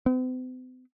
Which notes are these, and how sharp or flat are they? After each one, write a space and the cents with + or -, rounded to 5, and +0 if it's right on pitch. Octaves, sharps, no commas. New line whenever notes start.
C4 -45